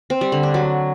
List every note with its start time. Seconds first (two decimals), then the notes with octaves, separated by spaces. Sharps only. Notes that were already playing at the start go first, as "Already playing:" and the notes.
0.10 C4
0.21 G3
0.32 D3
0.43 D4
0.54 F#3